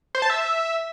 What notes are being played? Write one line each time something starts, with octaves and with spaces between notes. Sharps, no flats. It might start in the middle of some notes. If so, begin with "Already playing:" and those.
C5
A5
E5